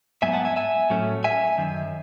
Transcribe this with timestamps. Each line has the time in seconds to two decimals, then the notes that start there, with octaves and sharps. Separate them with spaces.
0.22 G#2 F#3 B3 E5 G#5
0.33 F#5 A5
0.45 E5 G#5
0.56 E5 G#5
0.90 A2 F#3 A3 C#4
1.24 E5 G#5
1.58 F#2 D#3